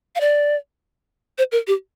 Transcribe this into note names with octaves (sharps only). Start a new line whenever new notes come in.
F5
D5
C5
A#4
G4